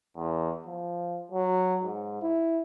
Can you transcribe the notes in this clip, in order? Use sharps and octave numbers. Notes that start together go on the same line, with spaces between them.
E2
F3
F#3
G#2
E4